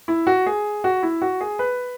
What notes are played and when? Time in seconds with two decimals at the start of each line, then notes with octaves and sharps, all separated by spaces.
0.08 E4
0.27 F#4
0.46 G#4
0.84 F#4
1.03 E4
1.22 F#4
1.41 G#4
1.59 B4